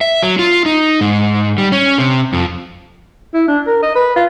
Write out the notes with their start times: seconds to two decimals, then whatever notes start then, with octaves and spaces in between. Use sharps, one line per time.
0.01 E5
0.23 F#3
0.39 F4
0.66 D#4
1.01 G#2
1.58 G3
1.72 C#4
1.98 C3
2.33 F2
3.34 E4
3.48 D4
3.67 A#4
3.83 D#5
3.95 B4
4.16 F4